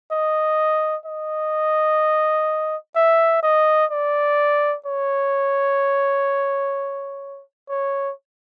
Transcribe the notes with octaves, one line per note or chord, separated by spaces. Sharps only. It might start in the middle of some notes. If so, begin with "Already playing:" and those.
D#5
D#5
E5
D#5
D5
C#5
C#5